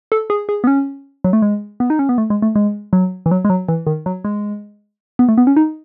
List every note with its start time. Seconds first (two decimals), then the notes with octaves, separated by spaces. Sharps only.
0.12 A4
0.30 G#4
0.49 G#4
0.64 B3
0.67 C#4
1.24 F#3
1.33 A3
1.42 G#3
1.80 B3
1.90 D#4
1.99 C#4
2.09 B3
2.18 A3
2.30 G#3
2.42 A3
2.56 G#3
2.93 F#3
3.26 E3
3.31 F#3
3.45 G#3
3.50 F#3
3.69 E3
3.87 D#3
4.06 F#3
4.25 G#3
5.19 B3
5.29 A3
5.38 B3
5.47 C#4
5.56 D#4